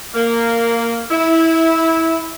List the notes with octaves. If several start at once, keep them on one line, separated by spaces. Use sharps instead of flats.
A#3
E4